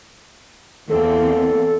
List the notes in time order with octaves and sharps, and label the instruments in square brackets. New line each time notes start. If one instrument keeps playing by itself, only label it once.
[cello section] E2 A#3 C4 [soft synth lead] A4